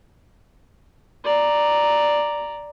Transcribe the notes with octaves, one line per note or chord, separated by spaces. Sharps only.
D5 A#5